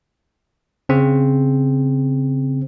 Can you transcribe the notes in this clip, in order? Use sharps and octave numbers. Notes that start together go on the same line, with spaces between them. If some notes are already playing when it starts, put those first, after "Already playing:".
C#3 C4